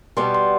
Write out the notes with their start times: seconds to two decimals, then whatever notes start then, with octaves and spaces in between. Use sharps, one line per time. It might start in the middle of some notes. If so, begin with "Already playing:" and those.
0.17 B2 G3 B3 C6
0.35 C6